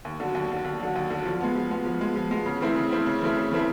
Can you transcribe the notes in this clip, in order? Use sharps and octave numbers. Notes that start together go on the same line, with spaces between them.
D#2
D3 F#3
D#2
D3 F#3
D#2
D3 F#3
D#2
D3 F#3
F3
G#3 B3
F3
G#3 B3
F3
G#3 B3
F3
G#3 B3
C#3
E3 A3 C4 E4
C#3
E3 A3 C4 E4
C#3
E3 A3 C4 E4
C#3
E3 A3 C4 E4